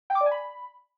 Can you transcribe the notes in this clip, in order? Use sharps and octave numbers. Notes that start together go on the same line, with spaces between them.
G5
D6
D5
G#5
B5